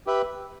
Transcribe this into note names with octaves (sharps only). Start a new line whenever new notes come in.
G4 B4 E5